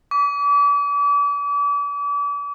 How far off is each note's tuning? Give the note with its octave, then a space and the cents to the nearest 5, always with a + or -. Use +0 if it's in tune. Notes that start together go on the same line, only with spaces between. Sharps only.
D6 -40